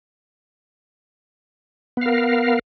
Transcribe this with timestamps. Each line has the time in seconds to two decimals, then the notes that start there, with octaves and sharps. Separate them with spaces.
1.97 B3
2.01 F5
2.06 A#4